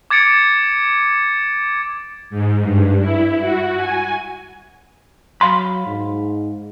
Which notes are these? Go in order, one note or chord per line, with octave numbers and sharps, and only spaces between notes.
D6 G#6 A6 C#7 D7
G#2
G2
E4
F#4
G#5
F#3 F5 B5 C6
G#2